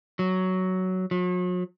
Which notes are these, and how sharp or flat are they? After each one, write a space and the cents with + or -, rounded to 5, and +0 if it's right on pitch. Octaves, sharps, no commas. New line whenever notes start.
F#3 +10
F#3 -40